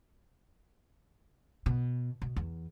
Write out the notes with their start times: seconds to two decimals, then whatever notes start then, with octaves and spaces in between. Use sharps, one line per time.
1.66 B2
2.22 B2
2.36 E2